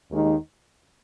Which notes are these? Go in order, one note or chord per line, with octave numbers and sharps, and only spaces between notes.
D#2 D#3 G#3 D#4